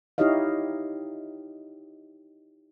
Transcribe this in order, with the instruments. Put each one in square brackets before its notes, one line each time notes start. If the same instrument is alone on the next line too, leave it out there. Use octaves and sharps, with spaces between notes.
[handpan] D#4 E4 G4 C#5 D#5 F5